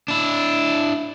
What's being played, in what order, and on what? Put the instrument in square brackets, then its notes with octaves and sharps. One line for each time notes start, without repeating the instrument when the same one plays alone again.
[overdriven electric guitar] D4 E4